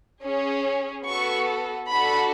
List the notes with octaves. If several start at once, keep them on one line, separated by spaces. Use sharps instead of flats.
C#4 G#4
B3 F#4 A4 C#6
D4 F#4 A4 B5